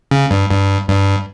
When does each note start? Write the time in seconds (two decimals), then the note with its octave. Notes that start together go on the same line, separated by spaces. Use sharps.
0.11 C#3
0.31 G2
0.50 G2
0.88 G2